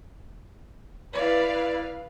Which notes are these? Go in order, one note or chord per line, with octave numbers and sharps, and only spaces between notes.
E4 B4 D5 F5